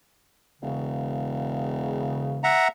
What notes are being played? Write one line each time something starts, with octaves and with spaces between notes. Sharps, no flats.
E1 C#3
E5 F#5 A#5